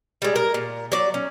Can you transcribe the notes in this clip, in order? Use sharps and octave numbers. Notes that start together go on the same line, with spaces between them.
G3 G#3
A#4
A#2
F#3 D5
C#4